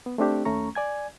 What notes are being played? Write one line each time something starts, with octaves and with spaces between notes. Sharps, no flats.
B3
A3 C4 D4 G4
D#2 A3 C#4 A#5 C#6
D5 G#5 G#6